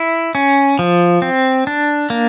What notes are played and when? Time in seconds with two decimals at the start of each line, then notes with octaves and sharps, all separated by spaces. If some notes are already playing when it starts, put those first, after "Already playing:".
Already playing: E4
0.35 C#4
0.79 F3
1.22 C4
1.67 D4
2.10 A#3